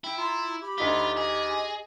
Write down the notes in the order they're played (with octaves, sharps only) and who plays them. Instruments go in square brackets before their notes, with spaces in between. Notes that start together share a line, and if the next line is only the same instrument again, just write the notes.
[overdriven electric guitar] E4 [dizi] G5
[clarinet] F4 [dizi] A#5
[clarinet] G4 [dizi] B5
[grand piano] D2 D#4 B6 [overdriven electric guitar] F4
[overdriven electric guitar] G#4 [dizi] D#5